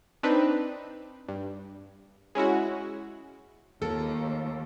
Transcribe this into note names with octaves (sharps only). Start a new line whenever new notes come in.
C4 D4 D#4 B4
G2
G#3 C#4 E4 F#4
D#2 A#3 F4 A4